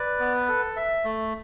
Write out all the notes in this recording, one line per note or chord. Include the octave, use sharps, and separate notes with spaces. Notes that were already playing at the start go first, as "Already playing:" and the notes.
Already playing: B4 D5
B3
A4
E5
A3